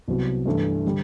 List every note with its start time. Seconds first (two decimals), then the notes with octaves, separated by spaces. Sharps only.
0.08 C2 C3 F#3 B3 F#4
0.45 G2 E3 A3 D4
0.86 D3 G3